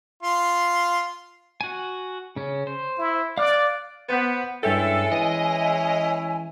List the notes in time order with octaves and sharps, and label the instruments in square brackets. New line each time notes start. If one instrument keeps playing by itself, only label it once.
[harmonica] F4 C6
[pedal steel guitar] F#4 G#5
C#3 C#4
C5
[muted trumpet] E4
[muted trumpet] D5 [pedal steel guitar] F5 F6 F#6
[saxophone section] B3 [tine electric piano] C5 F#5 G6
[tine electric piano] G2 E5 G5 [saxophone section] G#3 C#4 E4 [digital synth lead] A4 [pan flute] G#5
[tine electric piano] E3 [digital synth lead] D#5